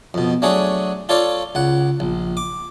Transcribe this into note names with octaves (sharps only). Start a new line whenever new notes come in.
F2 B2
F#3 A3 D4 G#4 C#5
F4 A4 C#5 D5 F5
C#2 F#5
A#1
D6